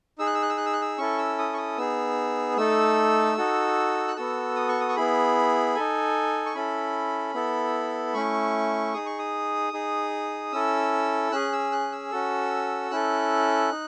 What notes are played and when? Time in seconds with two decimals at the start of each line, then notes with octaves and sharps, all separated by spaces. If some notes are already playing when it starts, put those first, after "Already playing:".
0.18 D#4 G#4 E6
0.27 F#6
0.35 E6
0.42 F#6
0.50 E6
0.58 F#6
0.66 E6
0.73 F#6
0.81 E6
0.98 C#4 E4 A4 C#6
1.18 E6
1.38 D#6
1.54 C#6
1.58 D#6
1.78 B3 D#4 G#4 E6
2.57 A3 D#4 A4 E6
3.37 D#4 F#4 A4
4.08 F#6
4.16 B3 F#4 A4 E6
4.56 D#6
4.69 C#6
4.80 D#6
4.89 C#6
4.96 B3 E4 G#4 B5
5.75 D#4 A4 G#5
6.46 C#6
6.55 C#4 E4 A4 B5
7.34 B3 E4 A4
8.14 A3 C#4 E4 C#6
8.94 D#4 G#4 D#6
9.06 C#6
9.19 D#6
9.73 D#4 G#4
10.52 C#4 E4 A4 E6
11.32 C#4 G#4 F#6
11.53 E6
11.72 F#6
11.92 E6
12.12 C#4 F#4 A4
12.91 C#4 E4 A4 F#6
13.71 D#4